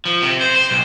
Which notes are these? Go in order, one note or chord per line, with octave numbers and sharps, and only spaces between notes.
F3
C3
C5
C5
B1